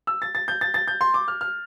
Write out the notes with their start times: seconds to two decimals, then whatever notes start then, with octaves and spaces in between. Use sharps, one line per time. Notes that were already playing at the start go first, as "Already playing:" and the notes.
0.07 E6
0.22 A6
0.35 A6
0.48 G6
0.61 A6
0.74 A6
0.88 G6
1.01 C6
1.14 D6
1.28 F6
1.41 F6